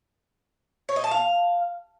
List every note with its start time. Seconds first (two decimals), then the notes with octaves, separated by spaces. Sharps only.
0.89 C#5
0.96 D#5
1.04 A5
1.11 F5